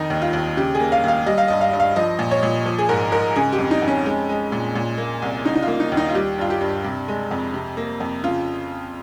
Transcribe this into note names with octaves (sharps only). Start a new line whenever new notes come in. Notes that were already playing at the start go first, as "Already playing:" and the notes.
Already playing: F2 D#3 D#4
D#2
F4
D#2
C#3 G4
A#3 G#4
F5
D#2 F5
G3 D#5
F5
G2 D#5
F5
G2
F5
F3 D#5
A#2
C#5
A#2
F3
G#4
G#2 A#4
G#2 A#4
C#3 G#4
G4
F2
D#4
F2
C#4
G#3
G#3
A#2
A#2
A#3
C2
C#3 D#4
D#4
F4
A#3
D#4
D#2
D#4
F4
G3 G4
G2 F4
G4
G2
C3
G#3
F2
C3
A#3
F2
C#3 F4